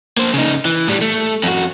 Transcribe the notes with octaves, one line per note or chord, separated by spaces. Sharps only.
A#3 C5
C#3 D#4
E3
A2 G3
A3
F2 F#4